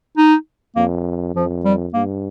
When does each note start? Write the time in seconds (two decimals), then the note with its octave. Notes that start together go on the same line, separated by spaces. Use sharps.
0.17 D#4
0.76 F2 A#3
1.35 F2 F3
1.65 G3
1.94 G2 A#3